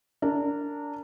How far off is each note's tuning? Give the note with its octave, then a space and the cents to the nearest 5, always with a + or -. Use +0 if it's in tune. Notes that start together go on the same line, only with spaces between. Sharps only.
D4 -20 A#4 -25